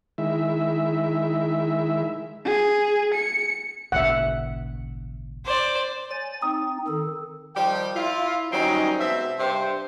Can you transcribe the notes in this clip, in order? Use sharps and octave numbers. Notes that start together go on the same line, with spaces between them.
D#3 G#3 E4 E5
G#4
C#7
G#1 C#2 A#2 E5 F#5
C5 D5
C#5 G#5 A6
C4 D#4 D#6
D#3 A4
D#3 F3 G3 G4 G5
E4 F4
D#3 F#3 G3 C4 C#4 D#4
G#2 B2 C4 E5
G2 C3 C5